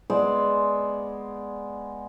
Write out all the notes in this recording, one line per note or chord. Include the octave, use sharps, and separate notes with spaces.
G#3 B3 C5 D5